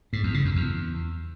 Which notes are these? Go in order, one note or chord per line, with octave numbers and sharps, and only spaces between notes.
G#2
E2
C#3
F#2
E2